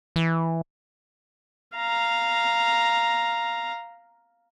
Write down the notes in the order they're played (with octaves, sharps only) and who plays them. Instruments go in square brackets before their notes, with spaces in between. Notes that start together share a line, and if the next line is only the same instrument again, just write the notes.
[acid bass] E3
[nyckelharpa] F5 A#5